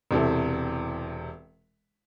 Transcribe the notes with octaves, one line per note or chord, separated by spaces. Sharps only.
E1 C3 E4 A4